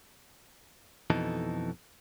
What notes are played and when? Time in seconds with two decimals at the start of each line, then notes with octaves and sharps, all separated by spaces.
1.10 F2 B2 E3 D#4 A4